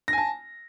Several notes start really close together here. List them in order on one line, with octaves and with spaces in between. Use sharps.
A#6 G#5 A5